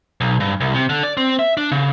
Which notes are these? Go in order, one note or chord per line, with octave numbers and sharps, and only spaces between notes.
B1
G2
C2
C3
D3
D5
C4
E5
D4
C#3